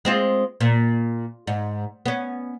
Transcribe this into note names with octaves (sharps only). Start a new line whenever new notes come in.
G#3 C4 F4
A#2
G#2
B3 C#4